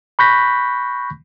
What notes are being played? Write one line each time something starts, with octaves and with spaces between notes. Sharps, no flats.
B5 C#6 F#6 G6 A#6 B6